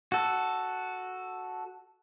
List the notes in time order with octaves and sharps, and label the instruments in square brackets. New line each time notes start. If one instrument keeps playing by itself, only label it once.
[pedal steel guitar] F#4 A4